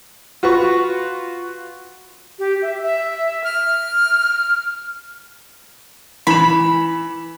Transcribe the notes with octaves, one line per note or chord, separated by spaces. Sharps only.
F4 F#4 B4 C#6
G4
E5
E5
F6
E3 B5 E7